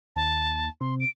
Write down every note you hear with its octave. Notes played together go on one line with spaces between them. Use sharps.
D#2 A5
C3 C6
D7